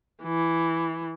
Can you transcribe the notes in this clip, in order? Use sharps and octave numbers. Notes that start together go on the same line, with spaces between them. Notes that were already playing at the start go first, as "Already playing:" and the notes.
E3